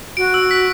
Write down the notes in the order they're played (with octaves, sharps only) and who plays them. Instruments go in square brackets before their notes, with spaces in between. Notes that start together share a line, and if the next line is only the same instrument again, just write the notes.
[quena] F#4 [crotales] D7
[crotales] E6
B6